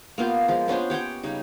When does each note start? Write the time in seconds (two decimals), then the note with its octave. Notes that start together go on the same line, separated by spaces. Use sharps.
0.18 A#3 B3 F4 G4
0.48 F3 G#3
0.68 B3 C#4 D4 C5
0.90 G4 C#5 F#5 G5
1.23 C#3 G3 D#4